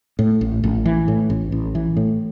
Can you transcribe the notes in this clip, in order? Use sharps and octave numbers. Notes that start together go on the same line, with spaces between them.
A2
A1
A1
E3
A2
A1
A1
E3
A2